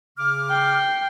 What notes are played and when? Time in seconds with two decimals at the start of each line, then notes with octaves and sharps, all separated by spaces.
0.18 C#3 D6 F6
0.50 G5 C7